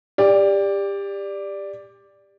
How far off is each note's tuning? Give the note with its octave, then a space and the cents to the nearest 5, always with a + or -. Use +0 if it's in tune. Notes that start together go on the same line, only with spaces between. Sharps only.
G4 +25 D5 +0